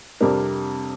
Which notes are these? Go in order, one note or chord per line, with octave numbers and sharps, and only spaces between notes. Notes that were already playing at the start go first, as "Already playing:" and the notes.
F2 C3 G3 D4 A#4